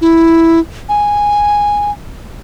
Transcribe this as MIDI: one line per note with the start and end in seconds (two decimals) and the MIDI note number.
0.01 0.59 64
0.89 1.91 80